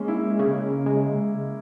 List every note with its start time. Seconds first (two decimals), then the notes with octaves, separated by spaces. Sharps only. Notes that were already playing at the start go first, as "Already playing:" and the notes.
Already playing: G#3 A#3 C#4
0.08 E4
0.39 C#3
0.86 G#3